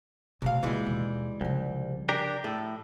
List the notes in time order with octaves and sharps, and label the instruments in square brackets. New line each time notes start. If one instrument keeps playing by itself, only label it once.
[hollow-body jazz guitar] C2 F5 [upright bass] B2 A3
[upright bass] A#2 A#3 [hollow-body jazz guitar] E3 G3 G#3
[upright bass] D#2 B2
[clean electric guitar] C2 [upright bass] C#3 F3
[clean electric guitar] D4 G4 A#4
[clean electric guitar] A2 [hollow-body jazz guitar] A4